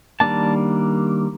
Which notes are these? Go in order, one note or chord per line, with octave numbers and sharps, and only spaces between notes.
D#3 G3 A#3 D4 A5